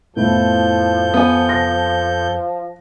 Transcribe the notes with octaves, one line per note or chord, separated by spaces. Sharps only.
F2 A2 F3 B3 E4 A4 G6
B3 G#5
A#6